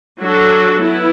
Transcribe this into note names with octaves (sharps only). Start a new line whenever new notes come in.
F#3 D4 F#4 A4
B3 E4